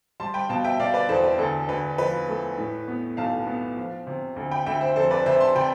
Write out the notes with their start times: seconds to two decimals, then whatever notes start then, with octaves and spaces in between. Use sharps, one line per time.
0.20 G3 A5 C6
0.34 G5 B5
0.49 B2 F5 A5
0.64 E5 G5
0.79 B2 D5 F5
0.94 B4 D5
1.09 E2 A4 C5
1.24 B4
1.39 D2 A4
1.69 D2 B4
1.98 F3 B4
2.28 A3
2.58 A2
2.88 B3
3.17 B1 F5 A5
3.47 B3
3.77 F3
4.07 C3
4.36 D2
4.51 G5 B5
4.66 D2 E5 G5
4.81 C5 E5
4.96 F1 A4 C5
5.10 B4 D5
5.26 C3 C5 E5
5.40 A5 C6
5.55 C3 G5 B5